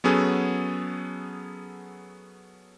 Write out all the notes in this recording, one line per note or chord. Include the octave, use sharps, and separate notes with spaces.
F#3 B3 C#4 G#4 A4